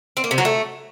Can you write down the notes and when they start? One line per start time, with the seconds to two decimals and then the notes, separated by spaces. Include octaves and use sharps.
0.17 C4
0.24 A#3
0.31 C3
0.38 F#3
0.45 A3